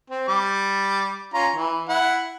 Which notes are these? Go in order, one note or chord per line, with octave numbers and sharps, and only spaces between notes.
C4
G3 D6
C#4 F4 A#5
E3
E4 F#5